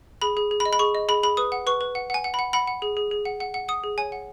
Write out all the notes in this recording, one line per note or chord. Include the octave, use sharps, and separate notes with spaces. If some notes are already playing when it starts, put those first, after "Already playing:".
G#4 B5
G#4
G#4
B5
D#5
B5
G#4 C#6
D#5
G#4 B5
G#4 B5
B4 D#6
F#5
B4 C#6
B4
F#5
F#5 G#5
F#5
B5
F#5
F#5 B5
F#5
G#4
G#4
G#4
F#5
F#5
F#5
F#5 D#6
G#4
C#5 G#5
F#5